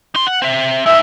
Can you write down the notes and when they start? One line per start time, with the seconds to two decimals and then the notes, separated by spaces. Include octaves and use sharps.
0.15 D#4 C6
0.27 F#5
0.42 C4 E5
0.86 G#3 D#4 E5